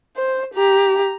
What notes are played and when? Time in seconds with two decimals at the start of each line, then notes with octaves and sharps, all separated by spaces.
0.16 C5
0.54 G4 A#5